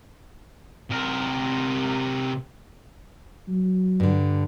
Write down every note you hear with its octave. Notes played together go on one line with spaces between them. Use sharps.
C3 A#4
F#3
G2 D3